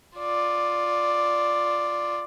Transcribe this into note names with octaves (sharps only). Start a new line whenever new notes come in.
F4 D5